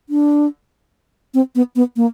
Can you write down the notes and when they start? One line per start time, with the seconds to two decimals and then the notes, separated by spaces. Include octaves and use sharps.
0.09 D4
1.34 C4
1.55 B3
1.76 B3
1.96 A#3